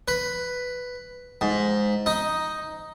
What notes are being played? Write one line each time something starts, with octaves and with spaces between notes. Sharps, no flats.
B4
G#2
D#4